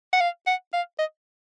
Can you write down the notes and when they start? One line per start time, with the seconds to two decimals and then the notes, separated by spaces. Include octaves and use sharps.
0.13 F#5
0.21 F5
0.47 F#5
0.73 F5
0.99 D#5